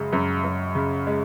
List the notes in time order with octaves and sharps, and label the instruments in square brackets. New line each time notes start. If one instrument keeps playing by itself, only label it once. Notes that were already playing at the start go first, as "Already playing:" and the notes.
Already playing: [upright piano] F#2 C#3 G#3
F#2
F#2
C#3
G#3